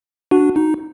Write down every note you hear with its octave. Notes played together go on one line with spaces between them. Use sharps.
D4 F#4
D#4